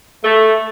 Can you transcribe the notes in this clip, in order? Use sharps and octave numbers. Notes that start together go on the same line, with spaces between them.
A3